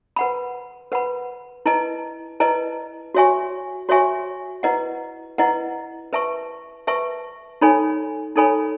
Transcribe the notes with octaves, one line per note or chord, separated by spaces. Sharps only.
B4 F#5 B5
B4 F#5 B5
E4 B4 D#5 A5
E4 B4 D#5 A5
F#4 C#5 E5 G#5 C#6
F#4 C#5 E5 G#5 C#6
E4 B4 D#5 F#5
E4 B4 D#5 F#5
B4 E5 A5 C#6
B4 E5 A5 C#6
D#4 A4 C#5 G#5 B5
D#4 A4 C#5 G#5 B5